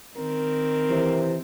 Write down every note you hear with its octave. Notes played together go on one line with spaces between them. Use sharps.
D#3 C4 A#4
C3 E3